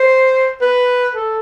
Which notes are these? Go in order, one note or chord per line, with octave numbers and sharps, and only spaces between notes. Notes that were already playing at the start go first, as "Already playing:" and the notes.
Already playing: C5
B4
A4